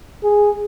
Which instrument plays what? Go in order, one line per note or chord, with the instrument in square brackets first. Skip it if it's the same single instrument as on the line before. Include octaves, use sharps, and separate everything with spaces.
[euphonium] G#4